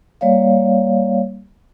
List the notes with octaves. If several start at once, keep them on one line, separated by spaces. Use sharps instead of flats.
G3 A#3 C#5 D5 F5